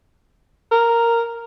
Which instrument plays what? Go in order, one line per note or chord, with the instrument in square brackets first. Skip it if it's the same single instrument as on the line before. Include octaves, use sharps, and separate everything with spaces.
[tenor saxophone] A#4